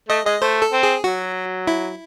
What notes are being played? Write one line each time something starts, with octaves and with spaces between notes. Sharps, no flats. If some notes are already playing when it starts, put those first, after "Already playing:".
A3 D#5
G#3 D#5
A3 C5
A4
C4
G#4
F#3 F#4
E4